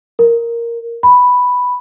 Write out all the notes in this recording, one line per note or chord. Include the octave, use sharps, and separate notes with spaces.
A#4
B5